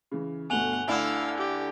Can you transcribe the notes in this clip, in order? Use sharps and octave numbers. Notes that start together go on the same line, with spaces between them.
C#3 E3
G1 B2 A3 F#5 G#5 F7 G7
D2 D3 E4 F5 E6
G4